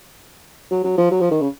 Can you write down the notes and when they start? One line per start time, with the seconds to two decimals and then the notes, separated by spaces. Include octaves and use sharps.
0.71 F#3
0.84 F#3
0.98 F3
1.11 F#3
1.21 F3
1.31 D#3
1.41 C#3